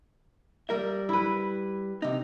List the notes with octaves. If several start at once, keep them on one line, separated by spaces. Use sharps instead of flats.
G3 A#4 E5
E4 B4
C3 D#4